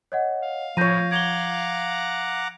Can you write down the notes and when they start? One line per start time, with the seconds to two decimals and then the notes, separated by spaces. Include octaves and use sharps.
0.12 C#5 D#5 F#5
0.42 F5
0.77 A2 F3 C#5 G6 A#6 D#7
1.11 F#5 A#5 D6 G#6 F7 G7